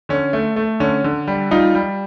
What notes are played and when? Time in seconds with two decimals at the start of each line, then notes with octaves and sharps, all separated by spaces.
0.09 D3 C#4
0.33 A3
0.56 A3
0.80 D3 C#4
1.04 D3
1.27 G3
1.51 G3 D#4 F4
1.75 G3